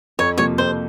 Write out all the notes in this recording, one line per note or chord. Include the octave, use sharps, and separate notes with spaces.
F2 C#5
C3 F3 A#3 C#5
F2 C5